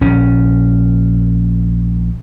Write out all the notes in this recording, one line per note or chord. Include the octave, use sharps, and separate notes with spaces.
A#1 C#4